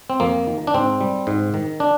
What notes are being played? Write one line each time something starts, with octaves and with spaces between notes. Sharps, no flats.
C4
F2 A#3
D#3
D4
G#2 C4
G3
G#2
D#3
D4